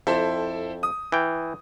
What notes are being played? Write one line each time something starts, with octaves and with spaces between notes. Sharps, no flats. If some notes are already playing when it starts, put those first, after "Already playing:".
F2 E4 A4 C5
D#6
E3 G5